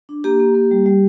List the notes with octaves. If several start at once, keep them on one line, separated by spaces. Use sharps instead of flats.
D4
A#3 G4
A#3
A#3
G3
G3